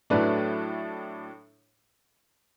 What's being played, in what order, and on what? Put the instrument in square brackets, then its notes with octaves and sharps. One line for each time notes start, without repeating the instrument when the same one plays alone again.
[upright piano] A2 F#3 A3 D4 B4